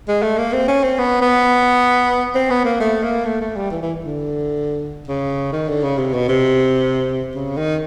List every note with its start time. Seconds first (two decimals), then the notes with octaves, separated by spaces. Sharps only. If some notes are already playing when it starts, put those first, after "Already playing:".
0.08 G#3
0.22 A3
0.37 A#3
0.53 C4
0.68 C#4
0.83 C4
0.98 B3
1.21 B3
2.35 C4
2.50 B3
2.65 A#3
2.80 A3
3.03 A#3
3.25 A3
3.40 A3
3.56 G3
3.71 E3
3.82 E3
4.05 D3
5.08 C#3
5.52 D#3
5.68 D3
5.83 C#3
5.98 C3
6.14 B2
6.29 C3
7.34 C#3
7.57 D#3